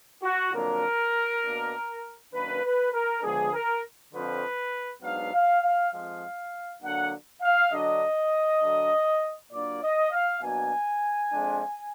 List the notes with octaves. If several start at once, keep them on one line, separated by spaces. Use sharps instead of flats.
F#4
F2 D3 F#3 A#3 D4 A#4
B2 A#3 D4
F#2 D#3 A#3 D4 B4
B4
A#4
D3 F3 G#3 B3 D4 G#4
A#4
F2 D3 F3 B4
G#2 F#3 B3 D4 F5
F5
F5
F2 F3 G#3 F5
D3 F#3 A#3 D4 F#5
F5
D3 F#3 D4 D#5
D3 F#3 D4
A#2 F#3 A#3 D4 D5
D#5
F5
B2 F#3 A#3 D4 G#5
F2 F3 G#3 D4